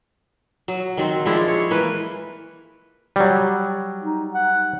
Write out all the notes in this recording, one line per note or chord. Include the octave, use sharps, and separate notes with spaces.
F#3
D#3 F#3 C4
F3 G#3 D4 E4
C#5
E3 A#3 B4
F#3 G3
D#4
F#5